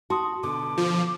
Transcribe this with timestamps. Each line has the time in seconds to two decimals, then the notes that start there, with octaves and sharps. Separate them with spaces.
0.10 F#4 A5 C6 D#6
0.43 B2 D3 D6
0.78 F3